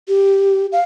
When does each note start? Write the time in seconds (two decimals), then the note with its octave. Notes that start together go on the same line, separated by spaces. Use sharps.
0.08 G4
0.72 F5